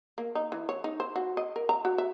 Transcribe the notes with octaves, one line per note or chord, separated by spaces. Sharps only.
A#3
D#4
E3
C#5
D#4
C5
F#4
D#5
A#4
A#5
F#4
E5